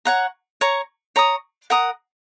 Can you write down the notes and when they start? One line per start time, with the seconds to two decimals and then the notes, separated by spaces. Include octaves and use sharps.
0.05 C#5 F#5 A#5
0.61 C#5 A#5 C#6
1.16 C#5 A#5 D#6
1.70 A#4 F#5 A#5 D#6